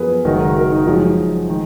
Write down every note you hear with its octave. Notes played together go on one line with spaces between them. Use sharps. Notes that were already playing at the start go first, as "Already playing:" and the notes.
Already playing: F#2 F3 B3 G#4 A#4 B4
F#1 F#2 D#3 G#3 F#4 A#4
F#4 A#4
F#4 A#4
D#4 F#4
F#2 F3 G#3
D#3 G#3